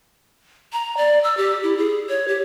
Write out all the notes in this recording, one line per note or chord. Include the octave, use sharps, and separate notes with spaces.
A#5
D5
E6
G4
E4
G#4
C#5
G4